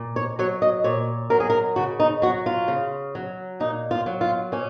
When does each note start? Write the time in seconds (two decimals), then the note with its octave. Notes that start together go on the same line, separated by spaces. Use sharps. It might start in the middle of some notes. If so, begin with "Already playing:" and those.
Already playing: A#2
0.16 C#5
0.39 F#3 C#5
0.62 D#5
0.84 A#2 C#5
1.30 F#3 A#4
1.40 G#4
1.50 A#4
1.76 C#3 F#4
2.00 D#4
2.22 F#3 F#4
2.46 F4
2.68 C#3
3.15 F#3
3.60 A#2 D#4
3.91 F4
4.06 F#3
4.21 F4
4.52 A#2 C#4